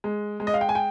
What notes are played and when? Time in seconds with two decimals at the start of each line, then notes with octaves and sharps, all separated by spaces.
0.04 G#3
0.40 G#3
0.47 D#5
0.54 F5
0.61 G5
0.69 G#5
0.75 G5